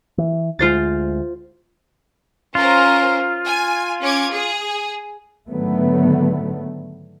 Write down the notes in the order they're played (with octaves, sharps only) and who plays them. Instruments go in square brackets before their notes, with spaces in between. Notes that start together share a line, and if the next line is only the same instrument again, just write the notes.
[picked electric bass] E3
[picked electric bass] D2 G#3 [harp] F4 C5 A6
[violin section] C#4 A#4 C5 [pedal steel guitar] F4
[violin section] G#5
C#4 D6 G#6
G#4
[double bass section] G#2 D3 D#3 F#3 A3 B3